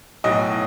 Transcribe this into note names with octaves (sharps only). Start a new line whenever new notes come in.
B1 A2 F#3 D#5